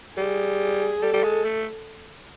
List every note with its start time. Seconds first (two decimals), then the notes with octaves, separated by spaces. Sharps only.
0.17 G3 G#4
1.02 G3 A4
1.13 G3
1.24 G#3
1.45 A3